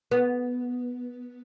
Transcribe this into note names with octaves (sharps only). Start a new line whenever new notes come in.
B3